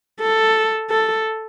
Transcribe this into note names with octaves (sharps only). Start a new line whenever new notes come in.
A4
A4